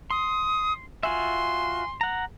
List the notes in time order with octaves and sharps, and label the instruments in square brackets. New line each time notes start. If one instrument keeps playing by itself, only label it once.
[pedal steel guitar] C6 [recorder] D#6
[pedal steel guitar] F4 F#4 E5 [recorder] G#5 [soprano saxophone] C6
[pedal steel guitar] F#5 A#5